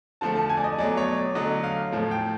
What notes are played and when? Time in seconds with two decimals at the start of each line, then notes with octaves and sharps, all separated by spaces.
0.21 D3 F3 A3 A5
0.35 A5
0.50 G#5
0.57 D5
0.64 D#5
0.78 B2 F#3 A3 D5
0.97 C#5
1.17 D5
1.35 D3 F#3 A3 D#5
1.63 F5
1.92 A2 F3 A3
2.11 G5